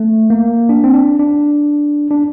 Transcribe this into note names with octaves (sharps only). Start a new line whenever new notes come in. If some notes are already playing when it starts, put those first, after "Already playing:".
Already playing: A3
A#3
D4
C4
D4
D4
D4